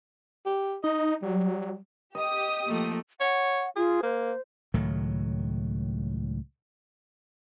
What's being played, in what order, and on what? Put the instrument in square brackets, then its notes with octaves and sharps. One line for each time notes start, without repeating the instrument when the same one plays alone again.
[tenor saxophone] G4
[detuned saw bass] D#4 [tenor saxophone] D#5
[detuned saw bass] F#3 [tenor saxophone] G3
[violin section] G4 D#6 [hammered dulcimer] D#5
[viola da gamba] F3 A3 A#3
[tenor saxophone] C#5 [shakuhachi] F#5
[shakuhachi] F4 [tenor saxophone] G#4
[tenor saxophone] A#3 [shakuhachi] C5
[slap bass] C#2 A2 D#3 F#3